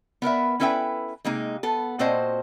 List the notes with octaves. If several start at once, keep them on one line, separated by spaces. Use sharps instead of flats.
B3 A#4 B4 E5
C#4 E4 A4 B4 E5 G5
C3 G#3 A#3 D#4
B3 A4
A#2 C4 F#4 C5 D#5 A5